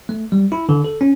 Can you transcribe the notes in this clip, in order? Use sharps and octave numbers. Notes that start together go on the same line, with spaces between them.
A3
G3
E4
D3
A4
C#4